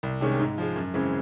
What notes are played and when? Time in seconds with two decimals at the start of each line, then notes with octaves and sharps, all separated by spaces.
0.03 C2
0.21 C3 D#3 G#3 C#4
0.40 G#2
0.58 F3 G#3
0.76 F#2
0.94 C#3 E3 G#3 C4